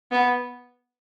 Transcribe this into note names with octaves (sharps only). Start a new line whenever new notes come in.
B3